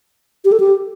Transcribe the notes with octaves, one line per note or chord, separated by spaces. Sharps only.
G4
A4
G4